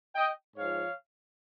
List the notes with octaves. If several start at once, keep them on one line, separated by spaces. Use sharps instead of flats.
D#5 G5
G#2 F3 C#5 F5